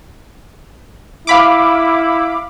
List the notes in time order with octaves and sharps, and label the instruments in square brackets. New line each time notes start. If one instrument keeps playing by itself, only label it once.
[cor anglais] E4 [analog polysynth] F5 B5 D6